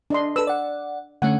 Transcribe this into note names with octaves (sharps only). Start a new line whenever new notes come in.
D4 D#5 C6
A4 B4 E6
D5 F#5
D3 A3 C#4 F#5